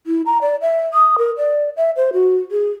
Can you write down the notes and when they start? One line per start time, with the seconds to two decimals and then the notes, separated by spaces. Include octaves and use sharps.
0.07 E4
0.26 A#5
0.42 D5
0.61 E5
0.94 D#6
1.18 A#4
1.38 D5
1.77 E5
1.96 C5
2.13 F#4
2.51 G#4